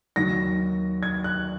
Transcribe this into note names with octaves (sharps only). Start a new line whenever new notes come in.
D#2 D#3 F#3 A#6
G#6
F#6